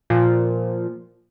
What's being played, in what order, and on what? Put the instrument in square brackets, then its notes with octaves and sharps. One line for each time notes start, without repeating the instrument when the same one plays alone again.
[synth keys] A#2 F3